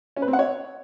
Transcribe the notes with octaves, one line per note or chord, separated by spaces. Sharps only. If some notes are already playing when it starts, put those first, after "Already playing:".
C#4
B4
C4
F#5
C#5